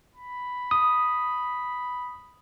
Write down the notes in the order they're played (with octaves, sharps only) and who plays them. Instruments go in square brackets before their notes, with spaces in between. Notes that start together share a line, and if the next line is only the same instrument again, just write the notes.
[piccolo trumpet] B5
[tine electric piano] D#6